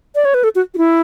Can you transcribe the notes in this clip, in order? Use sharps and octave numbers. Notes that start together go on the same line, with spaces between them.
D5
C#5
B4
A4
F#4
F#4
E4